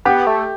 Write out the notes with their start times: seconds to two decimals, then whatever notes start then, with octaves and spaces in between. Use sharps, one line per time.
0.05 B3 G4
0.27 A3